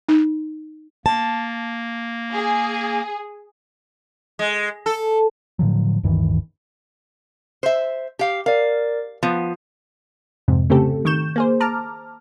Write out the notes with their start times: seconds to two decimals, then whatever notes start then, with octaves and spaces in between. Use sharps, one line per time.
0.09 D#4
1.06 A#3 A5
2.34 G#4
4.39 G#3
4.86 A4
5.59 A2 D3 F3 F#3
6.03 D1 G2 D#3 E3
7.63 C5 E5
8.19 G4 F5
8.46 A#4 D5 F5
9.23 F3 B3 F4
10.48 F2 G#2 C3
10.70 C#3 A3 C4 G4 A4
11.05 D#3 C#6 G6 E7
11.36 A#3 G#4 C5
11.61 A5 A#5 D6 F6